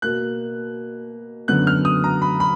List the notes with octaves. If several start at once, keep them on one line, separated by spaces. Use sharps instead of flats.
B2 A#3 F#6
F#2 D3 F#3 B3 F#6
F6
D#6
A#5
B5
B5